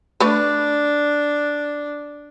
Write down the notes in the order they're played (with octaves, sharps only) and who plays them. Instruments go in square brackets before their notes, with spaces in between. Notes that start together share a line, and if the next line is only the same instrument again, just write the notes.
[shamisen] A3 B4 [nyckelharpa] D4